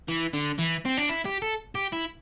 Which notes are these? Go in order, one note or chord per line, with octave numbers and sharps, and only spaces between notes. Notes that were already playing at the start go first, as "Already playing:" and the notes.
E3
D3
E3
C4
D4
E4
G4
A4
G4
E4